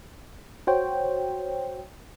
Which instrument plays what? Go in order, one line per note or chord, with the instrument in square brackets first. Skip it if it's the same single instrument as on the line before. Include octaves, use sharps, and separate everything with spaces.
[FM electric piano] F#4 C5 C#5 G5